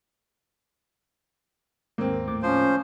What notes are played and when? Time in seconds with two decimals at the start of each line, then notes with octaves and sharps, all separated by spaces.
1.98 D#2 G#2 A#3 C4
2.28 A2 D6
2.42 F3 C#4 C5